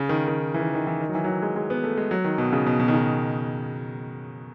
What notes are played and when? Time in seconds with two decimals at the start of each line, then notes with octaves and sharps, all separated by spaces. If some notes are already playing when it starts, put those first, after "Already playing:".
Already playing: C#3
0.09 D#3
0.28 D#3
0.54 E3
0.59 D#3
0.74 D#3
0.87 E3
1.01 D#3
1.09 F#3
1.15 E3
1.24 F#3
1.28 E3
1.42 G#3
1.56 G#3
1.70 B3
1.84 A3
1.97 G#3
2.11 F#3
2.24 D#3
2.38 B2
2.52 C#3
2.66 B2
2.80 B2
2.88 D#3
2.94 C#3